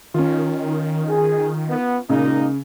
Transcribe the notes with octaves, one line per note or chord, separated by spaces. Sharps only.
D#3 C#4 F4
G#4
B3
A#2 C#3 G#3 A#3 D#4